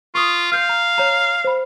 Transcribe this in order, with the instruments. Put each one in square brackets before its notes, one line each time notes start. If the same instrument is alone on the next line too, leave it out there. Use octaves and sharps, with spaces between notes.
[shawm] F4 [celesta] C#6 D#6
[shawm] F5 [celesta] F6 G6 C7
[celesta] A#5
C#5 A#5
C5 B5